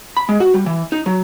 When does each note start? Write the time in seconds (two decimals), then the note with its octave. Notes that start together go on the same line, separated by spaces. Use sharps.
0.17 B5
0.29 G#3
0.40 F#4
0.54 G3
0.66 E3
0.92 D#4
1.06 F#3